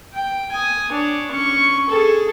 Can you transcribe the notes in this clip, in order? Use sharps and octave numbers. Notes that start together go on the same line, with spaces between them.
G5
G#5 D#6
D4 C#5
C#4 C#6
G#4 A4